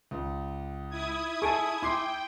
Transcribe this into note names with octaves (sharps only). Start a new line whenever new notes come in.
C#2
E4 D#6 G#6
G#4 A4 A5 C#6 D7 D#7
E4 G5 C6 D6 C7